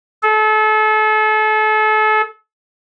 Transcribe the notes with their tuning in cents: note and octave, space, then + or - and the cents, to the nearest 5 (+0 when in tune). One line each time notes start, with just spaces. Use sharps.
A4 -35